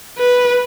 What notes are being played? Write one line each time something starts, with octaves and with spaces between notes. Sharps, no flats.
B4